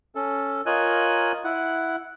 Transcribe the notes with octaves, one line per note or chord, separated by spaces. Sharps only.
C#4 A4
F4 A#4 C#5 D#5 G#5 F#6
E4 F#5